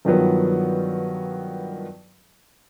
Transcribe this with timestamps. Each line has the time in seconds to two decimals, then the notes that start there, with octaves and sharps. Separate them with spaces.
0.05 G2 D#3 F3 F#3 B3